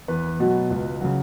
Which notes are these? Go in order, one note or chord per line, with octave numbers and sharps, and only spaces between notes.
E2 B4
B2 F#3
C#2
C#3 F#3